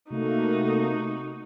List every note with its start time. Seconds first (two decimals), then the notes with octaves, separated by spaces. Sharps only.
0.10 C3 A3 A#3 D#4 F#4